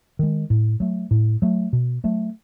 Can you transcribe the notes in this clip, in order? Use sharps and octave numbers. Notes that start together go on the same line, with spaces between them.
D#3 G#3
A2
F#3 A3
A2
F#3 A3
B2
F#3 A3